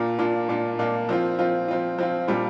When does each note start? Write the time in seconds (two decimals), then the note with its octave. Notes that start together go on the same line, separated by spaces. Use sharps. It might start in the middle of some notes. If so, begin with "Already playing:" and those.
Already playing: A#2 A#3 D4 F4
0.18 A#2 A#3 D4 F4
0.49 A#2 A#3 D4 F4
0.79 A#2 A#3 D4 F4
1.09 F3 C4 F4
1.39 F3 C4 F4
1.68 F3 C4 F4
1.98 F3 C4 F4
2.28 A#2 G3 D4 F4